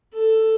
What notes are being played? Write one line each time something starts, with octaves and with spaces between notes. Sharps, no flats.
A4